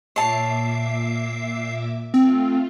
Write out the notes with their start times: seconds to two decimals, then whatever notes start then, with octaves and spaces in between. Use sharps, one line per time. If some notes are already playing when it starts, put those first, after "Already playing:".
0.16 A#2 C#5 E5 A5 D6 C7
2.14 A3 C4 F4